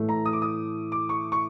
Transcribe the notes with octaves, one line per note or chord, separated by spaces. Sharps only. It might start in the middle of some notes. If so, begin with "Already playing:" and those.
Already playing: A2 E3 A3
A#5
D#6
D6
D#6
D6
C#6
C#6